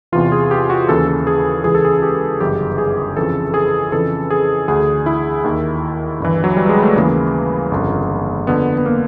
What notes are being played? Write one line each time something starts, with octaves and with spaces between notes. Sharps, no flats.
E2 C3 E3 F4
G#4
G4
F#4
D#2 C#3 E3 A4
A4
G#4
C#2 C#3 E3 G#4
A4
G#4
G4
G1 F#2 C#3 E3 G4
G#4
F2 C#3 E3 A4
G#4
F2 C#3 E3 A4
G#4
D2 D3 G#4
E4
D#2 D#3
G1 G2 E3
F#3
G3
G#3
A3
D#2 C#3 E3 A#3
G1 F2 C#3
F2 D3 B3
B3
A#3